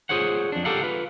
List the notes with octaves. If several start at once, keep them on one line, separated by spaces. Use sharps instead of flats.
F4 G#4 C5 C#5 F#5
F2 D4
G4 A4 A#4 F5 F#5
F4 B4